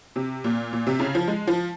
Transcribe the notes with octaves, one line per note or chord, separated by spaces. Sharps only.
C3
A#2
A#2
C3
C#3
F3
G#3
F3